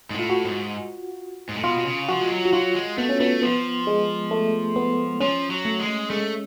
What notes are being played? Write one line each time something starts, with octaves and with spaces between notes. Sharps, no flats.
G#2
A2 F4
F#4
G#2
G#2
A2
B2 F4
B2
C#3
F3 F#4
G#3
F#3
F#4
F#3 F4
G#3
A3 B3
C#4
A3 B3
F3 B3
G#3
A3
B3
F3 C#4
F#3
A3
G#3
G#3 A3